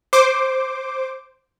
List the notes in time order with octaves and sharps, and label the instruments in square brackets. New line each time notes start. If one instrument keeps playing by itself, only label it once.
[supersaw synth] C5 D6